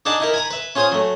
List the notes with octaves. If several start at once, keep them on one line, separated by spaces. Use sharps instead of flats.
D4 D#4 G#4 F#5 A5 D6
D#4 E4 A#4
G#5 A#5 B5
B4 E5
C#4 F4 G#4 C5 G#5 D#6
F#3 A3